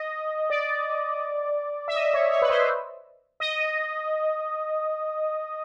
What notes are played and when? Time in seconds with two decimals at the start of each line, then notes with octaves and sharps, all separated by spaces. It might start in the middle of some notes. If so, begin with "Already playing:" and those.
Already playing: D#5
0.50 D5
1.88 E5
1.95 D#5
2.14 C#5
2.32 C#5
2.42 B4
2.50 C5
3.40 D#5